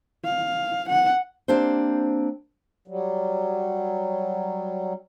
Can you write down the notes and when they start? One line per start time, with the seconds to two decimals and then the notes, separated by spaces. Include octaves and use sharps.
0.25 F5
0.89 F#5
1.48 A#3 C4 D4 G4 C5
2.88 F#3 G3